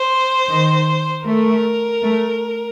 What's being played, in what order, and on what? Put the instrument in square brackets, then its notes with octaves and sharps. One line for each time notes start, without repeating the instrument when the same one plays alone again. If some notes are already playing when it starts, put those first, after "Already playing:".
Already playing: [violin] C5
[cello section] D#3
[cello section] A3 [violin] A#4
[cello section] A3